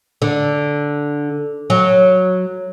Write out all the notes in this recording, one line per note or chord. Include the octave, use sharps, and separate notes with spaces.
D3
F#3